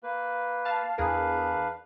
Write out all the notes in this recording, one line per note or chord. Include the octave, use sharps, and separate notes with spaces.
A#3 B4
F5 A5
E2 D4 G#4 A#4 B4 F5